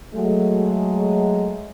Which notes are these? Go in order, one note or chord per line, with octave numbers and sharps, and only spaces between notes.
F#3 G#3 A3